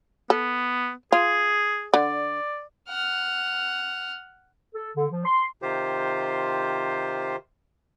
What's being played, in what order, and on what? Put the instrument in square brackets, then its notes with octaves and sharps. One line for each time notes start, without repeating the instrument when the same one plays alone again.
[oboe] B3 [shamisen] A4
[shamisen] F4 [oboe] G#4
[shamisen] D3 [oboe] D5
[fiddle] F#5 F6
[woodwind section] A4
D3
F3
C6
[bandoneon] C3 D#3 F4 G4 C5